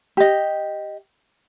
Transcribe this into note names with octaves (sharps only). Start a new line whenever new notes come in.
G4 D#5